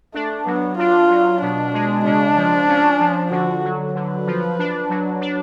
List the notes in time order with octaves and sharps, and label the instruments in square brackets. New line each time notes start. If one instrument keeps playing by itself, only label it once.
[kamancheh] A3 [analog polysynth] D4
[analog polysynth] F#3 [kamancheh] B3
[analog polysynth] D4 [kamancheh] F4
[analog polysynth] F#3
[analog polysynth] B2 [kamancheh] D4
[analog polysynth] G#3
[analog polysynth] C#3 [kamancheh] D4
[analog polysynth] F3
C#4
F3
[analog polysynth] D3 [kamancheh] F#4
[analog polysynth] F#3
[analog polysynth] D3 [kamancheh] B4
[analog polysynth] F3
D4
F#3
D4